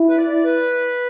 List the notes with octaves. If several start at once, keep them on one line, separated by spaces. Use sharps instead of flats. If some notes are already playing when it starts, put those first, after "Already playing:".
Already playing: E4
B4
D5
B4